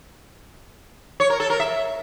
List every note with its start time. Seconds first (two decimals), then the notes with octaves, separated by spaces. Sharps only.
1.20 C#5
1.30 A#4
1.40 A4
1.50 A#4
1.60 E5